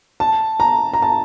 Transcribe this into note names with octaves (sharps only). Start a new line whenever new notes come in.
A5
A#5
A#5
A5